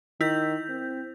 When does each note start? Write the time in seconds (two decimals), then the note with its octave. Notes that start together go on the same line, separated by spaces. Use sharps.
0.21 D#3 E4 G6
0.69 C4